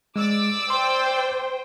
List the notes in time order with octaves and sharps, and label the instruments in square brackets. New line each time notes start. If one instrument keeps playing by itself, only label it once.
[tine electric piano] G#3 [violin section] D5 D6 E6
[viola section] C5 G5 [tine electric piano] C6